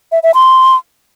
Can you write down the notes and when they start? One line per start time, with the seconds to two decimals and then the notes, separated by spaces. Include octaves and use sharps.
0.12 E5
0.23 E5
0.34 C6